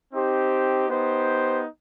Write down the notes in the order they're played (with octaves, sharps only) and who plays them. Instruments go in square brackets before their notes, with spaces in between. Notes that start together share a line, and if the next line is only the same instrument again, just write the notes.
[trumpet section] C4 D#4 G4 C5
B3 D#4 G4 C5